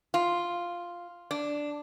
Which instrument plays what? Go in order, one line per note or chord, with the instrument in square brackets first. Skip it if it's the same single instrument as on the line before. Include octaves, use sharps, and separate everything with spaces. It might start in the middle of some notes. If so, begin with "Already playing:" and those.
[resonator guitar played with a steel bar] F4
D4